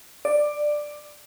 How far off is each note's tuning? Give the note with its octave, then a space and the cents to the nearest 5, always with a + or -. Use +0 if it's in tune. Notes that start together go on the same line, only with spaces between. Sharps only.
D5 +10